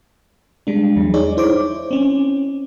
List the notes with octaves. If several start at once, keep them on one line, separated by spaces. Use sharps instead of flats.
G3 G#3 D4
E2 F#3
D#4 G#4 C#5 D5
E4 C5 C#5 D6
C4 C#4